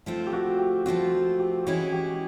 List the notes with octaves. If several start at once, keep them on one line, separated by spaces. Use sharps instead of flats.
F3 A3 C4 F4
G4
F#4
G4
F3 A3 C4 F4 F#4
F#4
G4
E3 G#3 C#4 E4 F#4
G4